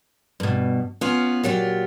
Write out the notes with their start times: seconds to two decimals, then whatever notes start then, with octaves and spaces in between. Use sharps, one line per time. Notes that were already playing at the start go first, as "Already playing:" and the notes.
0.40 G2 B2
1.01 B3 C#4 F4
1.43 A#2 F#3 F4 G4